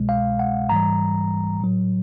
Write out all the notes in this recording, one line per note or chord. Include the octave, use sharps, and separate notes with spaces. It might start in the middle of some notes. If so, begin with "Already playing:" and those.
Already playing: C2 B2 G#3
F5
F#5
G#2 E3 G3 A#5
A2 F#3